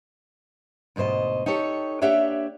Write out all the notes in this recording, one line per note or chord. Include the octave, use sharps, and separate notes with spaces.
D2 G#2 B2 C5 D#5
D#4 G4 A4 C#5
A#3 D4 G4 C#5 E5 F#5